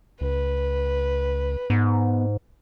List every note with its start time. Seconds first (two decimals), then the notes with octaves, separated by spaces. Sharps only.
0.21 C#2 B4
1.70 G#2 B3